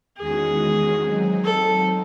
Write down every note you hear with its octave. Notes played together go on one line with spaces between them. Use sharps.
E2 D#3 G#3 C#4 F#4 G#4
F#3 C4 D#4
A4